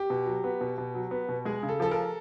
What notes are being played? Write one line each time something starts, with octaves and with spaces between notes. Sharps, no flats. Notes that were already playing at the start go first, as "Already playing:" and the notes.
Already playing: G4
B2
F#3
B3
B2
B2
F#3
B3
B2
G#3 G#4
C#3
A4
F3 A4
A#4